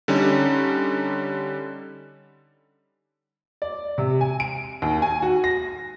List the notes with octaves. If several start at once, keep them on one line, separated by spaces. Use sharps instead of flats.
D3 G3 C#4 D#4
D5
C3
G#5
D7
D#2
G#5
F#4
A#6